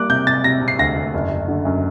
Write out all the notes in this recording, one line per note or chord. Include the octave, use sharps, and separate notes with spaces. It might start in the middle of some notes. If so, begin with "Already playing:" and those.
Already playing: G3 A#3 D6 F#6
C3 G6
C3 A6
C3 A#6
C3
C7
D2 A#6
D2
F#1
F#1
D3
F#2